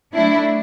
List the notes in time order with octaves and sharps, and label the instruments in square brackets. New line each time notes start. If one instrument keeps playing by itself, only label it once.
[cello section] F#3 A3 D4 [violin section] E4